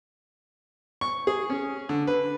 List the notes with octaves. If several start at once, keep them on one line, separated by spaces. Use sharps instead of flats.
C#6
G#4
C#4
D3
B4